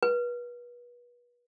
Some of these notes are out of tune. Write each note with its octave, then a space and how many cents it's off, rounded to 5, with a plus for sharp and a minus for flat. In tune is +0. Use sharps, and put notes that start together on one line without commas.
B4 -35